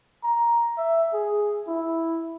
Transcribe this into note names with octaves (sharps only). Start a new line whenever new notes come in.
A#5
E5
G#4
E4